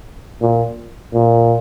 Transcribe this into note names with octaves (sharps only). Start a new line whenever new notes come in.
A#2
A#2